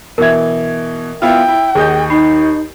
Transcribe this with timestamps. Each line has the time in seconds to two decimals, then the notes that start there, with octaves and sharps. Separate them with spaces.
0.18 B2 E3 A#4 E5 G#6
1.22 B3 E4 F4 G5
1.48 E4
1.75 D#2 G#4 D#5 G6
2.10 D#4 B5 C7